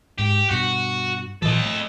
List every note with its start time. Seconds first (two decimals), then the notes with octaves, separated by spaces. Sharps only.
0.19 G#2 G4
0.50 G2 B2 F#4
1.42 A#2 E3 F#3 A4 D#5
1.65 A3